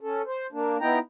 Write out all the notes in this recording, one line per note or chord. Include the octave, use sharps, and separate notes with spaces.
C#4 A4
C5
A#3 D4
B3 D#4 E4 G5 A#5